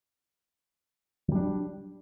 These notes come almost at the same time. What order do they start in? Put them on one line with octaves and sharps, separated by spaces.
F#3 G3 D4